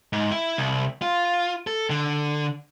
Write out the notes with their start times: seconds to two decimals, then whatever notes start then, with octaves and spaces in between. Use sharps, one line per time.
0.13 G#2
0.31 E4
0.58 C2
1.02 F4
1.67 A4
1.90 D3